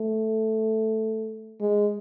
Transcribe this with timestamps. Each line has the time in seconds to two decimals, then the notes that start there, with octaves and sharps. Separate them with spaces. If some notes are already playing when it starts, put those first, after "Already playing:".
Already playing: A3
1.60 G#3